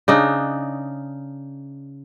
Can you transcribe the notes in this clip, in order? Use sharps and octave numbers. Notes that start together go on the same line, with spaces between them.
C#3 D4 D#4